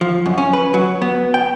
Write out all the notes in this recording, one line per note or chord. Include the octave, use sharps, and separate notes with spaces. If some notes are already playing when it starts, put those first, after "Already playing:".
F3
F#2
C#4
B4
F#3
B3
G5